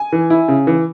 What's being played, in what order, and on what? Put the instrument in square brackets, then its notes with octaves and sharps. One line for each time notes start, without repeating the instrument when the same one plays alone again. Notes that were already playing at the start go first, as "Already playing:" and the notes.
Already playing: [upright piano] G#5
E3
E4
C#3
E3